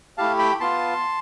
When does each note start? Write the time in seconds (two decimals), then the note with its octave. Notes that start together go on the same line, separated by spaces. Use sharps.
0.18 A3 E4 G4 F5 A5
0.38 G5 B5
0.60 B3 F4 A5 C6